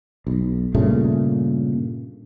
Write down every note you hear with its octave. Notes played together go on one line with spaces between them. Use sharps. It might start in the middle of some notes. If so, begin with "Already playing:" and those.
B1
G2 A#2 C#3 A3